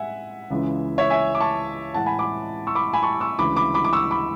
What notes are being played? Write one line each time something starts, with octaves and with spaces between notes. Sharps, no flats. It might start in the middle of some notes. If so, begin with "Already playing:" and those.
Already playing: A2 G#3 E5 F#5 G#5
C#2 C#3 E3 G#3
C#5 E5
E5 G#5
D6
A5 C#6
A2 E3 G#3 F#5 A5
G#5 B5
B5 D6
C#6 E6
B5 D6
G#5 B5
A5 C#6
C#6 E6
D2 C#3 E3 G#3 B5 D6
B5 D6
B5 D6
D6
C#6 E6
B5 D6